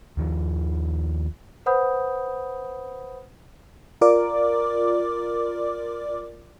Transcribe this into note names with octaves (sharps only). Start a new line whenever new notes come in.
D#2 D#3 F3
B4 C5 F#5 B5 D#6 G6
F4 A#4 D5 D6